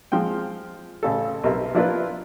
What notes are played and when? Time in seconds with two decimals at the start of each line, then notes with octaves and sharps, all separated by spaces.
0.12 F3 G#3 C4 G5
1.03 A1 C#3 A4
1.44 B1 C3 A#4 E5
1.74 F3 D4 E4 F4 A#4 B4